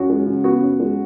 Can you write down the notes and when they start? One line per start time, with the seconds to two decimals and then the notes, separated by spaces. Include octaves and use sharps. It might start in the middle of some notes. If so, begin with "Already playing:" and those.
Already playing: F#2 F#4
0.10 G#3
0.27 C#3
0.44 B3 F#4
0.62 F#2
0.80 G#3